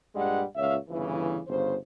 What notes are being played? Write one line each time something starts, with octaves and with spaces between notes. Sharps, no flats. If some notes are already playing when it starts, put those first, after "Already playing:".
G2 A#2 G3 G#3 F#5
C#2 A#2 C#5 E5 F5
G1 C#3 E3
G1 C#3 C5